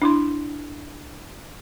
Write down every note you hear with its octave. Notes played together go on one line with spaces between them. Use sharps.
D4 E4 C6